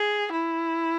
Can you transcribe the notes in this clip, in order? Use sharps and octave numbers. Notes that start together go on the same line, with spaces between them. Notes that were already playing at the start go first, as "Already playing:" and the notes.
Already playing: G#4
E4